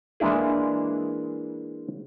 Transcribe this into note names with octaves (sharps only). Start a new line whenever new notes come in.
E3 G#3 A#3 D4 E4 G#4